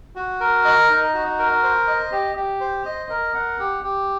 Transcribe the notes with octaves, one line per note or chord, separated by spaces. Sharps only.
F#4
A#4
D#5
D#4
F#4
A#4
C5
D#5
G4
G4
C5
D#5
A#4
F#5
G4
G4